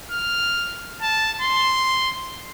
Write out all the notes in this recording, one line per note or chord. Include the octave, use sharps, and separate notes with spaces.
F6
A5
C6